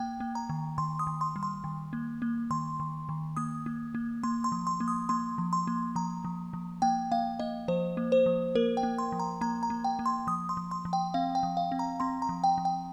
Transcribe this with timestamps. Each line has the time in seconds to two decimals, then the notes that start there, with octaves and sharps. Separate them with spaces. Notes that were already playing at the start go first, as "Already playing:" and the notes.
Already playing: A#3 G5
0.20 A#3
0.35 A#5
0.49 D#3
0.78 D#3 C6
0.99 D#6
1.07 D#3
1.21 C6
1.36 G3
1.43 C6
1.64 D#3
1.93 A#3
2.22 A#3
2.51 D#3 C6
2.80 D#3
3.09 D#3
3.37 A#3 D#6
3.66 A#3
3.95 A#3
4.23 A#3 C6
4.44 C6
4.52 F3
4.67 C6
4.80 A#3
4.88 D#6
5.09 A#3 C6
5.38 F3
5.53 C6
5.67 A#3
5.96 F3 A#5
6.24 F3
6.53 F3
6.82 A#3 G5
7.12 A#3 F5
7.39 A#3 D#5
7.68 F3 C5
7.97 A#3
8.12 C5
8.26 F3
8.55 A#3 A#4
8.77 G5
8.83 A#3
8.98 C6
9.12 F3
9.20 A#5
9.41 A#3 A#5
9.63 A#5
9.70 A#3
9.84 G5
9.99 A#3
10.06 C6
10.27 F3 D#6
10.49 C6
10.57 F3
10.71 C6
10.85 F3
10.93 G5
11.14 C4 F5
11.35 G5
11.43 F3
11.57 F5
11.72 C4
11.79 A#5
12.00 C4 C6
12.22 A#5
12.29 F3
12.44 G5
12.58 F3
12.65 G5